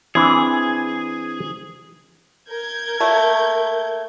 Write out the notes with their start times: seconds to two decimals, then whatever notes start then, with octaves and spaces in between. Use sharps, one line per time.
0.15 E3 C4 D4 G#4
2.49 A#4 G6 G#6
3.00 A3 A#3